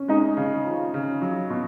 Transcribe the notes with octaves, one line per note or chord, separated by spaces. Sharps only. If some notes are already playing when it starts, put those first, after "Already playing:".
Already playing: C#4
G#3 D#4
C#3
F3
C#3
F#3
B2